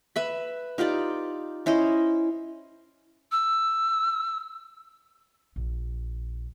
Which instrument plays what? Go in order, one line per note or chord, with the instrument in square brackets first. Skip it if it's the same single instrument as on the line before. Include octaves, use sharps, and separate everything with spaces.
[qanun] B4 E5 B5
D#4 F4 G4 D5
C#4 E4 C5 D#5
[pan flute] E6
[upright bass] A#1